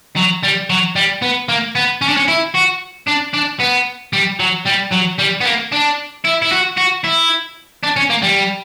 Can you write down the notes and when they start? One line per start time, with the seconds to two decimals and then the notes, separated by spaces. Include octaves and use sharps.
0.16 F#3
0.43 G3
0.70 F#3
0.96 G3
1.22 B3
1.49 A#3
1.75 B3
2.01 C#4
2.09 D4
2.17 C#4
2.28 E4
2.55 F#4
3.08 D4
3.34 D4
3.60 B3
4.13 G3
4.40 F#3
4.66 G3
4.92 F#3
5.19 G3
5.41 B3
5.45 A#3
5.72 D4
6.25 E4
6.42 E4
6.52 F#4
6.77 F#4
7.04 E4
7.83 D4
7.96 C#4
8.10 A#3
8.23 G3